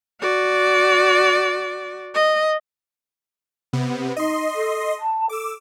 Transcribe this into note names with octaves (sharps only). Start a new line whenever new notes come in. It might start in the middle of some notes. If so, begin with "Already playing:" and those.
F#4 D5
D#5
C3 B3
D#4 D#5 C6
A4
A5
A4 D6 E6